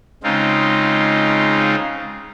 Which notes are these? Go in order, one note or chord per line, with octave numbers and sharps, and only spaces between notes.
C#3 G#3 C4 D#4 F4